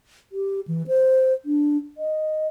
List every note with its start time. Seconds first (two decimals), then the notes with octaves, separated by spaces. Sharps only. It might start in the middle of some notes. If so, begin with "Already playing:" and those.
0.32 G4
0.68 E3
0.87 C5
1.45 D4
1.98 D#5